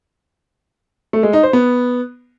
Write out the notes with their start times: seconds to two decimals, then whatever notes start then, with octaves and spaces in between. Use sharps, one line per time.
1.13 A3
1.23 G#3
1.33 D#4
1.43 C5
1.53 B3